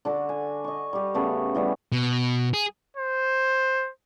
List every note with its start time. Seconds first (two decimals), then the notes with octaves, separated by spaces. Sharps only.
0.05 D3 D4 F#4 A4
0.29 G#5
0.64 D#5 C#6
0.93 G3 G4
1.14 C#3 A3 B3
1.55 E3 G3 B3 C#4
1.92 B2
2.54 G#4
2.97 C5